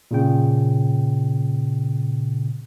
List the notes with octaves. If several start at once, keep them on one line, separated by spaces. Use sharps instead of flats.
A#2 C#3 G5